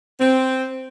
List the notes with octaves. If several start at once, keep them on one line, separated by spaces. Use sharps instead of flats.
C4